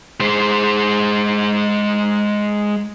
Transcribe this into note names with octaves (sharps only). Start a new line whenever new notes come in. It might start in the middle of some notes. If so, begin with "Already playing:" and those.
G#3 C5